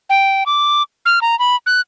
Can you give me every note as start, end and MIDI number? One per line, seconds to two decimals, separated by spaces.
0.10 0.44 79
0.46 0.83 86
1.06 1.20 89
1.22 1.38 82
1.39 1.56 83
1.66 1.81 90